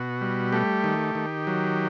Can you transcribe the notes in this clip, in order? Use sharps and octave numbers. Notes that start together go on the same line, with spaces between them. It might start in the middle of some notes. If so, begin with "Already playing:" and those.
Already playing: B2 F#4
G3
A3 G4
D#3
D#3
F#3